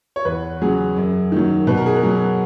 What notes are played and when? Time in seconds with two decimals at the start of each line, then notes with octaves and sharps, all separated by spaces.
0.16 C#5
0.25 E2 B4
0.62 C#3 F#3 G#4
0.97 F#2
1.32 D#3 F#3
1.67 B2 B4
1.77 A#4
1.86 G#4
1.96 A#4
2.03 F#3